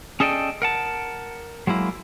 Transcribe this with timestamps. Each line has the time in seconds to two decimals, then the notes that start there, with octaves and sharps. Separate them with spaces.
0.20 C#4 G#4 A4 D5 D#5 G5
0.62 A#4 F#5 A5
1.67 F#3 G#3 A#3 E4